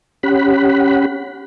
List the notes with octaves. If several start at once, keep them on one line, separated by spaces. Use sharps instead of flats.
C#4 G4 F#5 B5